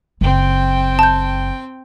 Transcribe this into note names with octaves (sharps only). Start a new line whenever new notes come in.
F#1 C4 G5
A5 G6